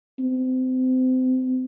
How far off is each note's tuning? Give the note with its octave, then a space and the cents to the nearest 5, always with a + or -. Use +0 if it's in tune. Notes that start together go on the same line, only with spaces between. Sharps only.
C4 -30